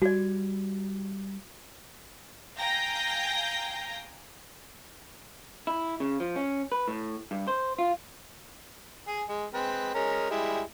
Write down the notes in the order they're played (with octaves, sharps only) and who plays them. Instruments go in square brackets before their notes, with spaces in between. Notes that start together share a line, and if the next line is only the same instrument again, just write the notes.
[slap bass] G3 [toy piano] F#4 D5
[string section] F5 G5 G#5 A#5 G6 A#6
[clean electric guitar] E4
C#3
F3
C#4
B4
A2
G2
C5
F4
[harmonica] G#4 G#5
G#3
G#3 C4 B4
G#3 C#4 A#4
G3 G#3 E4